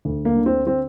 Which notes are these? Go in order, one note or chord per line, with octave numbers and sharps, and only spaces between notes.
D2
A#3
D3
C4
C4